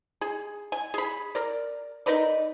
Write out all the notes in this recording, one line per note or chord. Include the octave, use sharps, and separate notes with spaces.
G#4
G#5
G#4 B5
A#4 D5
D#4 A#4 B4 D5